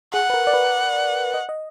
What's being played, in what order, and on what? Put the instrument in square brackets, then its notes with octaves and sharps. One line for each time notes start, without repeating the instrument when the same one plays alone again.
[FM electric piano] G#4 [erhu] F#5
[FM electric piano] B4
A#4
D5
B4
D#5
D#5